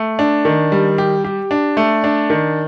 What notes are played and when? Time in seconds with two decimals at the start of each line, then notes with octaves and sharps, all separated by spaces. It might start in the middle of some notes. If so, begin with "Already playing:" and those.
Already playing: A3
0.19 D4
0.45 D#3
0.72 G3
0.98 G4
1.24 G4
1.51 D4
1.77 A3
2.04 D4
2.30 D#3